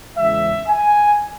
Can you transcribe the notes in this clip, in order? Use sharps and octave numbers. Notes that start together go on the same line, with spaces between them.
E2 C#3 E3 G#3 E5
G#5